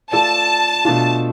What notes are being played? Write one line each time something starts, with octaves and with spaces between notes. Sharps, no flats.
A3 F4 A4 D5 A5
B2 A3 D4 F4